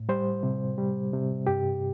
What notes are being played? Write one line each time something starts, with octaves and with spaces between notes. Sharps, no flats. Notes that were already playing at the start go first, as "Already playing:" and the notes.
Already playing: A2
G3 C5
C3
G3
C3
G2 G4